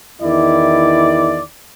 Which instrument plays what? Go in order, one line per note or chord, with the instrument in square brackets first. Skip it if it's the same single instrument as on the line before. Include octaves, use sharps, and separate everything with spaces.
[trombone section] E2 D#3 E4 [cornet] D5